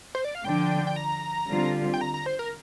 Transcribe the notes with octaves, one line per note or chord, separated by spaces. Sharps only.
C5
D5
F5
D3 F3 D4 G5
G5
A#5
D3 G3 C4 F4
G5
A#5
A#5
C5
A#4